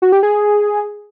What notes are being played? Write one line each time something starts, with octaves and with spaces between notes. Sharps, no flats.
F#4
G4
G#4